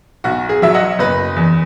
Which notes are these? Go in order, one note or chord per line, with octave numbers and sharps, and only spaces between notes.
B1 F#4
G#4
F#3 E5
D#5 F#5
F#1 B4 D#5
E2